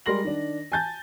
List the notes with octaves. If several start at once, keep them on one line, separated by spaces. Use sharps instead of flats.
G3 G#3 A#4 C6 A#6 F#7
D#3 D4
G#5 A5 G6 A6